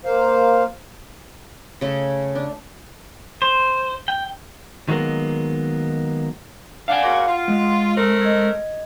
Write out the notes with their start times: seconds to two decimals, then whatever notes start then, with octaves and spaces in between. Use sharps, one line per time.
0.05 A#3 C5 F5
1.81 C#3 A3
2.35 D4
3.42 C5
4.08 G5
4.88 D#3 F#3 G#3 A#3 B3
6.88 D4 F5 F#5 G#5
7.02 A#2 C#3 F#4
7.28 F4
7.48 G#3
7.96 A3 C4 A#4
8.21 D#5 G#6